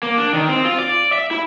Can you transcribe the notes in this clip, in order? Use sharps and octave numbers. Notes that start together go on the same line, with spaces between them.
A#3
D4
D#3
C4
F4
D5
E5
E4